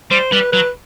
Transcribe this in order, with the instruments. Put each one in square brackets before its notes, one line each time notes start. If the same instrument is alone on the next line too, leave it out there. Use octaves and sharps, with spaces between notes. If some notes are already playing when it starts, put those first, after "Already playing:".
[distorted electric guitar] G3 [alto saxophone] C5
[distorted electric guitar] G3 [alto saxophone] B4
[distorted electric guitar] F#3 [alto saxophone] B4